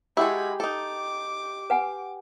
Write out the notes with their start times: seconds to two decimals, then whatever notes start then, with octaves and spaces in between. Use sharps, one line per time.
0.17 G#3 E4 F#4 G4 A4 B5
0.60 D#4 A4 D6
1.70 B4 F#5 G#5